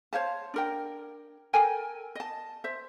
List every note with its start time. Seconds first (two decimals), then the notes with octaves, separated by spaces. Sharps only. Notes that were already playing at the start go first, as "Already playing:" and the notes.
0.13 C5 C#5 F5 A5
0.54 D4 A#4 G5
1.53 A4 A#4 G5 G#5
2.15 D#5 A5
2.64 C5 E5